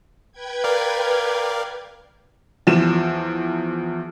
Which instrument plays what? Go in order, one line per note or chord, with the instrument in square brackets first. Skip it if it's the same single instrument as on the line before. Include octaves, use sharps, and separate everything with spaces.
[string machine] B4 G5 G#6
[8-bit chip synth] A#4 D5 F5
[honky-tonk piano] E2 F3 E7